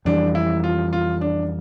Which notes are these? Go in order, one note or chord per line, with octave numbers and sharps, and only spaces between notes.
F2 E3 G3 D4
E4
F4
F4
D4